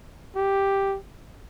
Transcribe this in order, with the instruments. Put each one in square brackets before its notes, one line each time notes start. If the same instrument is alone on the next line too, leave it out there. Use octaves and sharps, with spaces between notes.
[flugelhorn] G4